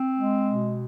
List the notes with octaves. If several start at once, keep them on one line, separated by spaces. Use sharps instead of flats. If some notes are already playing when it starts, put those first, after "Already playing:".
Already playing: C4
G#3
B2